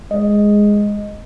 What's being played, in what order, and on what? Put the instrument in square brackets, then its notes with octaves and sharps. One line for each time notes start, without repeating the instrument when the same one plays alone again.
[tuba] G#3 [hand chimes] D#5